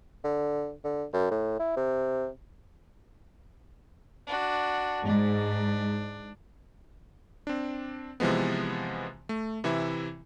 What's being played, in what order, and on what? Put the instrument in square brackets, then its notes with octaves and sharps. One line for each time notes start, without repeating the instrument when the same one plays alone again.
[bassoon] D3
D3
F#2
A2
E4
C3
[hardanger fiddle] D4 F#4
[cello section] G#2 [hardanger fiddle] D4
[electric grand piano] C4 D4
C3 E3 F3 G#3 B3
A3
C3 E3 E4 E5